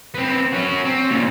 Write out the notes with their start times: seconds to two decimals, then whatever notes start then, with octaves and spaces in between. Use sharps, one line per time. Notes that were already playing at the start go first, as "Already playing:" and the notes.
0.14 B3 C4
0.53 C#4 F#4
0.85 C4
1.10 A#2 C#3